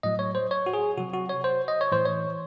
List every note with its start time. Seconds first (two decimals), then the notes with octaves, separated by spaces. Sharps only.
0.03 A2 F#3 D#5
0.19 C#5
0.35 C5
0.51 C#5
0.66 F#4
0.73 G#4
0.97 C3 F#3 F#4
1.14 F#4
1.29 C#5
1.44 C5
1.68 D#5
1.81 C#5
1.92 A2 E3 C5
2.05 C#5